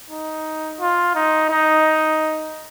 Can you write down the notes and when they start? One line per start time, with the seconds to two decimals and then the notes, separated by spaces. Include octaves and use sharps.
0.10 D#4
0.80 F4
1.15 D#4
1.50 D#4